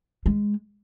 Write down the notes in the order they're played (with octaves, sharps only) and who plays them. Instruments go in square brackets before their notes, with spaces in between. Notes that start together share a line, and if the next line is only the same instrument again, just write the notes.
[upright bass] G#3